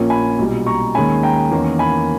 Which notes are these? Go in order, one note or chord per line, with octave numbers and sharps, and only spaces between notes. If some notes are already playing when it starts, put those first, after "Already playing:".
Already playing: A#1 A#2 A#3 C#4
G#5 B5
B1 A#2 G3
A#5 C#6
D#2 D#3 G#3 C#4 G#5 B5
G5 A#5
E2 D#3 A#3 C#4
G#5 B5